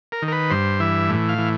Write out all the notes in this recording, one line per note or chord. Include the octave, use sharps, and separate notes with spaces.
A#4
D#3
A#4
B4
G2 C5
E3 E5
A2
F5
E3